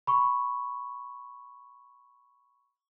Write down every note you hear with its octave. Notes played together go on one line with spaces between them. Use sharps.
B5 C#6